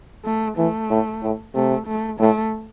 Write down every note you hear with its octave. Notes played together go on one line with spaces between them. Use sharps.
A3
E3 A3
A2
A2
C3 A3
A3
A2 A3